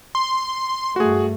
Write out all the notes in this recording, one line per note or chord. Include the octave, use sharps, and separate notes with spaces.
C6
G2 A3 F#4 G#4